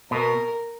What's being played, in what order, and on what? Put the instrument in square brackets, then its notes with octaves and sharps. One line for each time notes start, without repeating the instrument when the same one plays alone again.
[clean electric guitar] B2 [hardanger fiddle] A#4